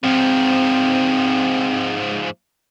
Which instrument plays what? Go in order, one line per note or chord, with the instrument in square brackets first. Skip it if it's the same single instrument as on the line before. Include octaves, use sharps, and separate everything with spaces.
[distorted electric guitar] G#2 F3 [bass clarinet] C4